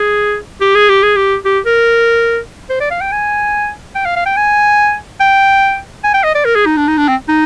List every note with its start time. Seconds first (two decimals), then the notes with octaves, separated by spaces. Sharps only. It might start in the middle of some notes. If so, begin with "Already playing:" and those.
Already playing: G#4
0.61 G4
0.75 G#4
0.89 G4
1.03 G#4
1.16 G4
1.45 G4
1.66 A#4
2.70 C5
2.81 D5
2.90 F5
3.01 G5
3.12 G#5
3.95 G5
4.05 F5
4.16 F5
4.26 G5
4.36 G#5
5.20 G5
6.04 G#5
6.14 G5
6.24 D#5
6.35 D5
6.45 A#4
6.55 G#4
6.66 D#4
6.77 D4
6.87 D#4
6.97 D4
7.08 C4
7.28 D#4